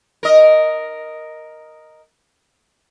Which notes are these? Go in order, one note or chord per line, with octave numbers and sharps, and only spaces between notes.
A#4 D#5